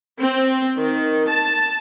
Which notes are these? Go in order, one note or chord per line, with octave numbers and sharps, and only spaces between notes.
C4
D#3
A5